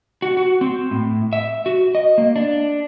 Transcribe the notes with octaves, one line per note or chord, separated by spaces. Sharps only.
F#4
F#4
C4
A2
E5
F#4
D#5
A#3
D4